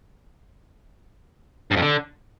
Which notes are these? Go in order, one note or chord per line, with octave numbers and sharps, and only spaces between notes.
G2
F2
D3